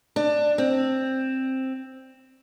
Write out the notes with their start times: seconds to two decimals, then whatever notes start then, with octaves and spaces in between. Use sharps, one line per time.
0.16 D4
0.58 C4